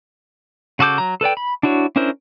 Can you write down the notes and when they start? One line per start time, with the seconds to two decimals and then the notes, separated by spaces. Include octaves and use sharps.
0.79 C#3 F#4 A4 D6 G6
0.98 F#3 A#5
1.21 A4 B4 D5 G5
1.37 B5
1.63 D4 E4 F#4 C#5
1.96 C#4 D4 E4 A#4 C5